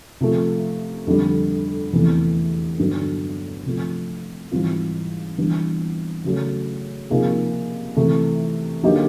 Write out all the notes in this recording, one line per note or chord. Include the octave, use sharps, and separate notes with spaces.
C3 F3 A3
F2 D3 G3
E2 C3 E3 A3
G2 D3 F#3 B3
C3 F3 A3
G#2 E3 G3 C4 F4
E3 G3 B3 D4
C#3 F#3 A3
C3 F3 A#3 D#4 G#4
C3 E3 A3
D3 F#3 A#3 D#4 G4